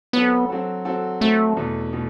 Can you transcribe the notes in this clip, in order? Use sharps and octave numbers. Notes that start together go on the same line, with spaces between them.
F#3 B3 C4 F#4 A4
F#3 C4 F#4 A4
F#3 C4 F#4 A4
F#3 A3 C4 F#4 A4
E2 B2 A3
B2 A3